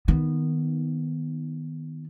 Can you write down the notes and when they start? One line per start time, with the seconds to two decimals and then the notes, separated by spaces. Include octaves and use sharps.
0.08 D#3 B3